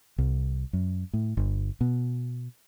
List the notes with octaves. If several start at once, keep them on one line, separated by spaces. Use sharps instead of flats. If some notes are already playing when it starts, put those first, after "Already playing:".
C2
F#2
A2
G1
B2